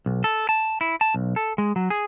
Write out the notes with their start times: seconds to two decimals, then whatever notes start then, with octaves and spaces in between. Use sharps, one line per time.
0.06 B1
0.24 A4
0.49 A5
0.81 E4
1.01 A5
1.14 B1
1.36 A4
1.58 G#3
1.76 F#3
1.90 G#4